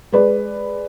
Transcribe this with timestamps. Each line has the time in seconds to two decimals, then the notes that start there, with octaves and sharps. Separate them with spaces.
0.12 G#3 B4 D5